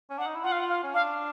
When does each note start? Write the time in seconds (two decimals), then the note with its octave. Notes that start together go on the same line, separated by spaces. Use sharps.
0.10 C#4
0.18 D4 F#5
0.26 D#4
0.35 E4
0.44 F4 F#5
0.52 F5
0.60 F#5
0.69 F5
0.83 C#4
0.94 D4 F5